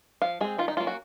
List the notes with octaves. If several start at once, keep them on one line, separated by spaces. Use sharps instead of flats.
F3 F5
G#3 C4 G#4
D#3 F4
D#4
F#3 A#3 C#4 F4
F#4